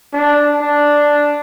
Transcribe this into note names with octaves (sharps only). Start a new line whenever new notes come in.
D4
D4